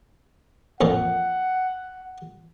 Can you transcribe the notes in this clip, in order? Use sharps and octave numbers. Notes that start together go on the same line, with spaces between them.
F2 A#2 F3 F#5